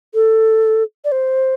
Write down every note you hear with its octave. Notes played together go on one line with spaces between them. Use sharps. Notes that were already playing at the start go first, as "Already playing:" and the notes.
A4
D5
C5